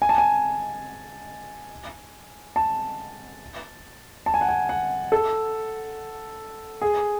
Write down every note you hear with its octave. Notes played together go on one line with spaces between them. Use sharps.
G#5
A5
G#5
A5
A5
G#5
F#5
G#5
F#5
A4
G#4